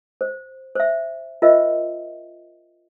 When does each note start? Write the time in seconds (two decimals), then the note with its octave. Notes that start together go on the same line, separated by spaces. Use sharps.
0.21 C5
0.75 C5 E5
1.42 F4 A#4 C5 D#5 E5